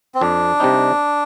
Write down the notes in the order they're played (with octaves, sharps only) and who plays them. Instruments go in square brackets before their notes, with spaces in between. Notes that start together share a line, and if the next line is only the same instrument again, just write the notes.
[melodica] C4
[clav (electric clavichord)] F2 [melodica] D4
[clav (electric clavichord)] C3 G3 C4 D#4